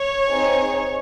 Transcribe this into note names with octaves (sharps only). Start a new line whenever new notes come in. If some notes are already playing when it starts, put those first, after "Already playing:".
Already playing: C#5
C4 D#4 G#4